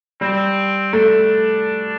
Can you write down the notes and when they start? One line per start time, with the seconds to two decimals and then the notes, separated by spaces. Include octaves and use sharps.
0.21 G3 C4
0.93 A3 D4